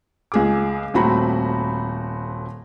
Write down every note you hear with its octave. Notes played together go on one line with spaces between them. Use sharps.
C#2 G#4 D6
D#1 A3 C4 F#4 A#5 B5